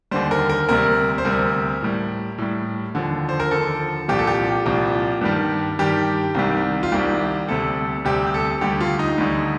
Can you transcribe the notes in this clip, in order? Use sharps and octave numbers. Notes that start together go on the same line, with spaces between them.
D#2 D3 G3 C5
A#4
A#4
D2 C3 G3 A#4
C5
D2 C3 G3 A#4
A2 G3
A2 G3
D#2 D3 F3
C5
A#4
D#2 D3 F3 A4
C2 A#2 F3 G4
A4
G4
C2 A#2 F3
G2 D#3 G3
G2 D#3 G3 G4
C2 C3 D#3 G3
F4
C2 C3 D#3 G3 G4
D2 C3 G3 A4
D2 C3 G3 G4
G4
A4
D2 D3 G3 G4
F4
D#4
D2 D3 G3